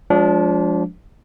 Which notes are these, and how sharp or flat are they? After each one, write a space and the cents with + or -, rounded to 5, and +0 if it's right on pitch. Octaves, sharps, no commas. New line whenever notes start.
F3 +20 G#3 +0 D4 -25